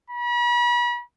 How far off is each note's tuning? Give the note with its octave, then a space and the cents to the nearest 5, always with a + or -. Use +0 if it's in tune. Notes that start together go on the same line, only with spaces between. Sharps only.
B5 -40